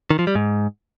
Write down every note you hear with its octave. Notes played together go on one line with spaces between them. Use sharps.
D#3
F3
G3
G#2